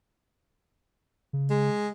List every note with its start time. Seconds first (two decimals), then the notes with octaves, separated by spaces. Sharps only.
1.33 C#3
1.50 G#3